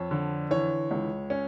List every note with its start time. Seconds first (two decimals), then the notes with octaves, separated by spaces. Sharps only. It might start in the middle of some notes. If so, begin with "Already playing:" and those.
Already playing: F2 C#5
0.11 D3
0.51 E3 C#5
0.91 C#2
1.30 C#4